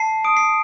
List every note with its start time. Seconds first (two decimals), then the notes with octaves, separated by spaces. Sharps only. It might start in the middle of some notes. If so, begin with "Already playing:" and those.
Already playing: A5 C7
0.24 D#6 D7
0.37 C7